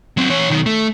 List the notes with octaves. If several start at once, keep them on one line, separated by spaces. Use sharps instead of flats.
F#3 C4
E3 C#5
B1 D#3
A3